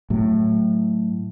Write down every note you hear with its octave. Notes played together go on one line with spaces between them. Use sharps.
A2 F#3